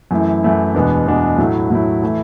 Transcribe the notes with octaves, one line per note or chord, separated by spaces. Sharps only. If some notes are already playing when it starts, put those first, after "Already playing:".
F#2 E3 A3 E4
F#2 E3 A3 E4
E2 B2 G#3 B3 D4
E2 B2 G#3 B3 D4
A2 F#3 A3 E4
A2 F#3 A3 E4
E3 A3 E4